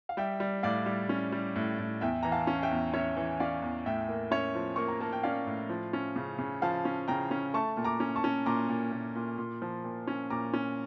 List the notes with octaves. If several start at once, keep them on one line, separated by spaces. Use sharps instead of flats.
F5
G3 E5 G5
G3
A2 D5 F5
G3
C#4
G3
A2
A2
E2 E5 G5
E3 A#5
F5 A5
C#4
E5 G5
E2
C#4 C#5 E5
E3
C#4 D5 F5
E2
A2 E5 G5
A#3
C#4 C#5 E5
F3
A#3 C#6
A#5
A#3 A5
G5
C#4 D5 F5
A2
F3
C#4
C#3
C#3
F3 F5 A5
C#4
C#3 G5 A#5
C#4
A3 A5 C#6
A#2
A#5 D6
C#4
A5 C#6
C#4
A#2 A#5 D6
A#2
A#2
A#2
A#2
F3
A#2
C#4
A#2 A#5 D6
C#4